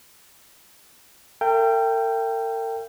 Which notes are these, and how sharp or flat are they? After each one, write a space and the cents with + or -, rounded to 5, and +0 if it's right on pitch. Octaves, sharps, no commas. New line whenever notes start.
A#4 -45 E5 +45 G5 +0